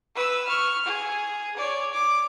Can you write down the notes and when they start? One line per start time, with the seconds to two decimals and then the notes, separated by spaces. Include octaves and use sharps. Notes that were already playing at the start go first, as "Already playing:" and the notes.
0.15 B4 E6
0.48 C#6 F6
0.86 G#4
1.57 C#5 D5
1.94 D6